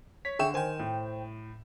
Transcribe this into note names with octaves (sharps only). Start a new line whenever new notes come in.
C#5 B6
D3 G#4 E5 G5 C#6 E7
D#3 C5 G5 G#5
A2